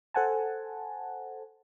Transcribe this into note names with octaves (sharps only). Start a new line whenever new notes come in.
A4 C5 F#5 G#5 A5